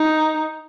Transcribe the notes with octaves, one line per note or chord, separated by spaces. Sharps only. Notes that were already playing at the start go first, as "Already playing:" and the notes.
Already playing: D#4